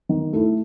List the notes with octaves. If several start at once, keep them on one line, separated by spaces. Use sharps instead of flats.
D#3
A3 E4